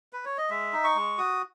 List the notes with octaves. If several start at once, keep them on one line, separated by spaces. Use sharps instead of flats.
B4
C#5
D#5
G#3 E5
D#4
C#6
G#3
F#4 D#6